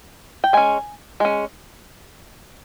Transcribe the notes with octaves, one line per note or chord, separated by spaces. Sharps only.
G5
G#3 C#4 G#5
G#3 C#4